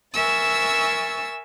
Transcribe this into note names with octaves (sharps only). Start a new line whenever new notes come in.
A#4 E5 G#5 C#6 E6 A6